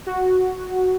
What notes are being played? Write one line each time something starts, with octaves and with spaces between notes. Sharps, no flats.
F#4